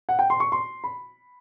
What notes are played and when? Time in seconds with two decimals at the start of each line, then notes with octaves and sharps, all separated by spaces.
0.09 F#5
0.19 G5
0.30 C6
0.40 C#6
0.52 C6
0.84 B5